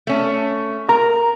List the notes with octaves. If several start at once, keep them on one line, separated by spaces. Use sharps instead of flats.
A3 C#4
A#4 A#5